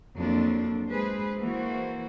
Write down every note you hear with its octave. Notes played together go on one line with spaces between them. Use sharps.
F2 F#3 A#3 D4
G#3 G#4 B4 C5
E3 A#3 F#4 C5